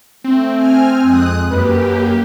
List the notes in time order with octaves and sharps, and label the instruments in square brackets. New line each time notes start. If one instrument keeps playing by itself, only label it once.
[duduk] A3 [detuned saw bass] C4
[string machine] G#5 F6
[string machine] F2 D#6 F#6 [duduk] G#3
[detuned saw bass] F#2 [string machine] A#3 G4 [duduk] B4